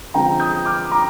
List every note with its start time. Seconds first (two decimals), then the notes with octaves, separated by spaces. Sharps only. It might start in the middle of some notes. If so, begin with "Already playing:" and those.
0.14 D3 F3 G#3 C4 G5 A#5
0.40 D#6 G6
0.66 D6 F6
0.91 A#5 D6